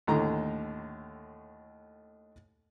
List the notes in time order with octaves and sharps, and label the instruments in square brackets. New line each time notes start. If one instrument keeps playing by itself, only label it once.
[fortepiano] D#2 A2 D3 A#5